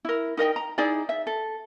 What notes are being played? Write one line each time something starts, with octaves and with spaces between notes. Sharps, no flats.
E4 A#4
D#4 A#4 D#5 G5
A#5
D#4 E4 G#4 D5
E5
A4